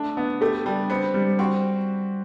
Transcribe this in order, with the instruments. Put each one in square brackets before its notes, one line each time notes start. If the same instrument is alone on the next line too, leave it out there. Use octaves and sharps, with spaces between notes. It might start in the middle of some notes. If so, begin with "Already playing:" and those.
Already playing: [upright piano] A3 D4
B3
[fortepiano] A3 [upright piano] G4
[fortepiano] G3 [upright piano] D4
[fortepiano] B3 [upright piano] C4
[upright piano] G3
[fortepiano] C4 [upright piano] F#4